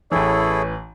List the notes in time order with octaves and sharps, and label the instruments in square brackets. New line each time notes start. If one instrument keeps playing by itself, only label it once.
[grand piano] A1 E3 [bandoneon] E4 G#4 A4 [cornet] C#5